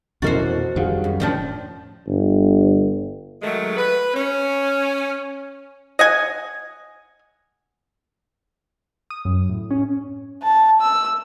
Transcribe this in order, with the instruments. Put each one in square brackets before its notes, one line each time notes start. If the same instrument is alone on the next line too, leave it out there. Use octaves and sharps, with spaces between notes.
[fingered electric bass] F2 E3 [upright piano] B2 C#4 A6 [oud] F#4 A#4 C5
[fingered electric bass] F2 D#3 G3 [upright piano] G#4 F5 F#5
[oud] F#2
[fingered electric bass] E1 A2 C#4 [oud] D#3 F3 D4
[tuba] G1
[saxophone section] D#3 F#3 G#3 A3
B4
C#4
[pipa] D#5 F#5 G#5
[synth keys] D#6
F#2
A2
C#4
[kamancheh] A5
E6